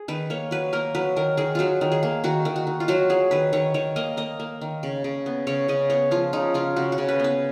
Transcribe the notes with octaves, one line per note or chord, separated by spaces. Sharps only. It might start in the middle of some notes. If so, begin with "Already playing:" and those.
Already playing: G#4
D#3 B4
A#3 C#5
F#3 B4
A#3 A#4
F#3 B4
D#3 A#4
D#3 G#4
F#3 F4 F#4
D#3
G#4
A#3
D#3 F#4
D#3
F#4
D#3
F4
F#3 F#4
F#3 G#4
D#3 B4
D#3 C#5
D#3 C#5
A#3 D#5
A#3 D#5
A#3
D#3
C#3
C#3
B3
C#3 C#5
C#3 D#5
B3 C#5
F3 F4
C#3 D#4
C#3 F4
C#3 F#4
F#4
C#3
B4
B3 B4